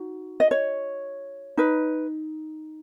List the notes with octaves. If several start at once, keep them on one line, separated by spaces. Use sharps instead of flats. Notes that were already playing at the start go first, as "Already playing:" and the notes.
Already playing: D#4 F#4
D#5
C#5
D#4 B4